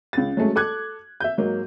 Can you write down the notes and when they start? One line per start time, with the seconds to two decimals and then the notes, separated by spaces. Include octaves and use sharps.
0.13 C#2 A6
0.37 F#3 G#3 A3 C#4
0.56 A4 D6 F#6 G#6
1.20 E5 G6
1.38 G#2 F#3 A#3